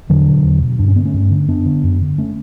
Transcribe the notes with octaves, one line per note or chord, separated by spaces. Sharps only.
E2 D3 F#3
B2
E2
B2
G2 D4
C#4
D3 B3
A3 C#4
G2
D3
F#2 B3 D4
D3
F#2
D3
A3 C#4